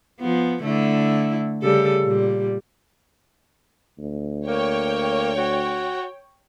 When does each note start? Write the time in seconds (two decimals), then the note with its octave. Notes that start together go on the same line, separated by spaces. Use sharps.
0.20 F3 B3
0.64 D3 A3 E4
1.63 C#3 G3 A4
2.03 A#2 G3
3.98 D2
4.48 A#3 C#5 G5
5.37 F#4